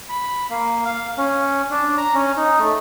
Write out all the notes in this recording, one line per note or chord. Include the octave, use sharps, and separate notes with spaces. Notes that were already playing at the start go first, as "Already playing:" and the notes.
B5
A#3
F5
C#4
D4
A#5
C#4
D#4
A3